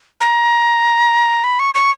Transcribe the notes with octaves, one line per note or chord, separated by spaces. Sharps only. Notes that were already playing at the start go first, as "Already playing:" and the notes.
A#5
B5
C#6
C#6